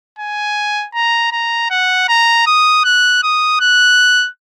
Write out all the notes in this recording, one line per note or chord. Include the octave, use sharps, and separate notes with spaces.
G#5
A#5
A#5
F#5
A#5
D#6
F#6
D#6
F#6